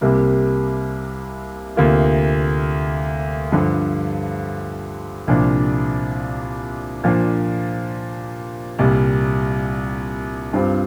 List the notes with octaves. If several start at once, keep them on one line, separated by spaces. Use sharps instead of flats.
C2 C3 G3 A#3
D2 C3 A#3 F4
G2 D3 F3
C2 A#2 F3 D4
A#2 F3 D4
C2 A#2 G3
G2 G3 C4 F4